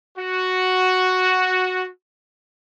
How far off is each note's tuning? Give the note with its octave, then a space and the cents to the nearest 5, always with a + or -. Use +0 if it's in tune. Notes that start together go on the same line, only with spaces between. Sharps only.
F#4 +0